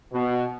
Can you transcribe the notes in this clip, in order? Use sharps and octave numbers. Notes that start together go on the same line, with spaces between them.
B2